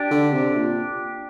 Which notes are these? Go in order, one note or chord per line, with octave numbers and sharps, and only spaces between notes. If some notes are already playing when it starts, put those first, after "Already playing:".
Already playing: D4 G4 D5
D3
C3
A#2